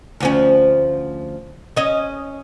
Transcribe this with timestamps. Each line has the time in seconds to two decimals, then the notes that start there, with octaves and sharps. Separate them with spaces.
0.20 D2 F3 C#4
1.77 C#4 D#5